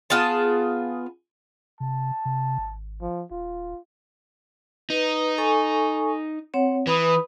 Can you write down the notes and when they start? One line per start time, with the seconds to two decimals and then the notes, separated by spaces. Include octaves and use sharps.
0.10 B3 F4 G#4 A5
1.80 C3 A5
2.25 C3
2.58 G#1
3.01 F3
3.31 D#1 F4
4.90 D#4 B4
5.38 A4 G#5 C#6
6.54 C4 C#5 F#5
6.87 E3 B4 B5 D#6